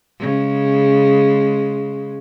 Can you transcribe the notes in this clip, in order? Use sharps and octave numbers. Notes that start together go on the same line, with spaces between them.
C#3 G#3